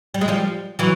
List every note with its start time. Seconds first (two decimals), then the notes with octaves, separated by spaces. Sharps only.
0.14 G3
0.21 G#3
0.28 F3 G3
0.79 E3 F#3